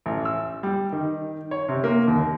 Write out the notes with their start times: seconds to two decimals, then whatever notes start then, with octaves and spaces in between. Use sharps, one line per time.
0.06 A1
0.25 E6
0.63 G3
0.92 D#3
1.51 C#5
1.69 C3
1.84 A#3
2.08 D#2